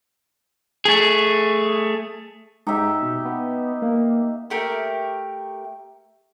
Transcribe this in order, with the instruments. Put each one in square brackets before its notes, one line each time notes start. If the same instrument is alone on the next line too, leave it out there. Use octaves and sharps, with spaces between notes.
[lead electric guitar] A3 G#4
[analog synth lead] G#2 [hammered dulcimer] D#4 G4 E5
[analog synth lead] B2
B3
A#3
[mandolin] A3 G4 A#4